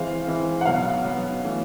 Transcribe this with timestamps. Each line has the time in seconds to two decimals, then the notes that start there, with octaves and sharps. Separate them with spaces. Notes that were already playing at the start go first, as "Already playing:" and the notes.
Already playing: E3 G#3 C4 F5
0.27 E3 G#3 C4
0.61 F#5
0.65 B2 F#3 B3 F5
1.04 B2 F#3 B3
1.44 E3 A3 C#4